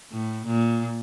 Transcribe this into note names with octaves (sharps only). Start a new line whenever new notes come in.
A2
A#2